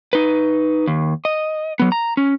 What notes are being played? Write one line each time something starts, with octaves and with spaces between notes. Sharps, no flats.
D#4 B4
D#2
D#5
F#3 B3
A#5
C#4